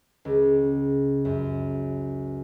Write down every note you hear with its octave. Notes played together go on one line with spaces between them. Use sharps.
C#2
F#2